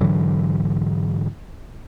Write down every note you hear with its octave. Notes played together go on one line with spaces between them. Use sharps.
G#2 D3 E3 F#3